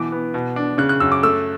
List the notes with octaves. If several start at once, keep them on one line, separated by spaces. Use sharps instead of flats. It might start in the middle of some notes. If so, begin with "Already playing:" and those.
Already playing: B2 E3 D6
B3
B2
D4
C#3 F#6
F#6
F#2 E6
D6
A3 E6